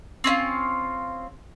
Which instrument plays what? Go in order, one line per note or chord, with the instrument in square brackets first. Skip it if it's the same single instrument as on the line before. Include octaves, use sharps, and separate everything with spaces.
[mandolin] C4 C#4 E4 F4